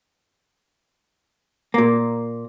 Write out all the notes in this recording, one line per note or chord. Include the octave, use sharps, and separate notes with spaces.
A#2 A#3